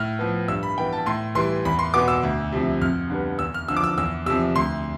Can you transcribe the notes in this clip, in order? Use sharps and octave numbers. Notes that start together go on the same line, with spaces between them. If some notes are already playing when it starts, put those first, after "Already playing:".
Already playing: A2 F6
F3 B3
G2 E6
B5
E3 B3 G5
A5
A2 C6
E3 G3 C6
E2 B5
C6
B2 B3 D6
E6
D2
C3 F3
F2 F6
D3 G3 B3
E2 E6
F6
D3 F3 E6
D6
E6
E2 E6
C3 F3 E6
D2 C6